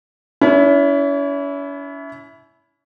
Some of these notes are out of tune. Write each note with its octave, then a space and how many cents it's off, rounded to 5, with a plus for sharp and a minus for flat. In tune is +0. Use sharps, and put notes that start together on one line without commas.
C#4 +40 E4 +0